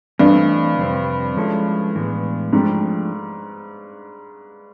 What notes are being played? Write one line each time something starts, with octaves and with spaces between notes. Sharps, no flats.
G2 E3 A3 C4 D#4
F2 C3 E3 G3 C4
F3 G#3 C#4 E4 A4
A2 E3 G#3 B3
G#2 F3 A3 D4 G4